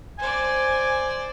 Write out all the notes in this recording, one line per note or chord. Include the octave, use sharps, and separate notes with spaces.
C5 D5 G#5